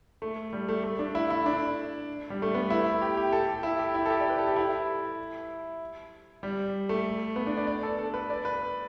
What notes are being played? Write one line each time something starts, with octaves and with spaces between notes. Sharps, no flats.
A3
G3
A3
A3
D4
E4
E4
D4
G3
A3
B3
E4
G4
G4
A4
G4
E4
G4
E4
A4
G4
D5
B4
A4
G4
E4
G3
A3
B3
D4
D5
D5
A4
A4
B4
D5
B4